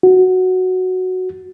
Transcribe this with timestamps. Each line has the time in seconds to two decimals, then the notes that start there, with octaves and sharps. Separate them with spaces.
0.03 F#4